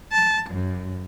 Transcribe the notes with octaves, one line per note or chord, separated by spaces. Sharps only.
A5
F#2